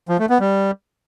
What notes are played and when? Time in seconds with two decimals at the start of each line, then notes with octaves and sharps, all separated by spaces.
0.09 F3
0.19 A3
0.30 B3
0.40 G3